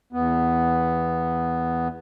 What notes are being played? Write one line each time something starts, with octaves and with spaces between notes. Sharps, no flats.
E2 B3